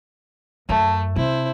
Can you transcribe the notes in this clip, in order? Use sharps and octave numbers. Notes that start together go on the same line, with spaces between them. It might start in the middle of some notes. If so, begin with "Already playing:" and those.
F#2 A3
C3 E4 C5